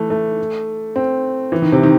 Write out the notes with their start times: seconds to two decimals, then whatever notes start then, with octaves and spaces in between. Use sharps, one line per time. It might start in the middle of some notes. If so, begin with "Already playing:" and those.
Already playing: E3 A3
0.10 A3
0.96 C4
1.52 E3
1.62 D#3
1.72 C3
1.83 D#3